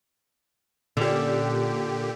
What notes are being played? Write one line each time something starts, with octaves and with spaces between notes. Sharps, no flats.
A#2 D3 C#4 G4